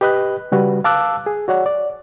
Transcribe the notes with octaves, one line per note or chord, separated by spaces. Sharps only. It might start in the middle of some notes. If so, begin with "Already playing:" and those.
G4 B4 D#5 B5 F#6
C#3 G3 F#4 B4
F5 A5 D6 E6 F#6
G#4
F#4 C#5 D5 F#5
D5